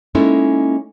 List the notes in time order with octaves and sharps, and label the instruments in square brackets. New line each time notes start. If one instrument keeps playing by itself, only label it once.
[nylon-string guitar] G#3 A#3 C#4 D#4 E4 A4